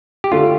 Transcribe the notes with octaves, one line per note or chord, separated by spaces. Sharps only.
G4
D3 A3 D4 F4